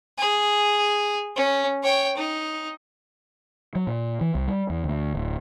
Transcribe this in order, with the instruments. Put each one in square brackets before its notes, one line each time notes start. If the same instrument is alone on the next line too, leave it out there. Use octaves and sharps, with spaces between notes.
[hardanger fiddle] G#4
C#4
C#5 G5
D#4
[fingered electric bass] F#3
A#2
E3
C2
G3
E2
D2
D1